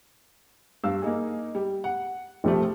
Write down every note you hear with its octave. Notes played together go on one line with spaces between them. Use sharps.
G2 F5 E6
A#3 D#4 G#4
G3
F#5
A#1 C3 F3 G3 A3